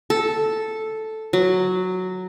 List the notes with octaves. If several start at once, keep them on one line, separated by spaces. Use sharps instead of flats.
A4
F#3